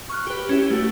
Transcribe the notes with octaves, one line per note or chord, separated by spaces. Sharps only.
C#6 F6 F#6
G4 B4
C#4 E4 G4
A3 F#4 G4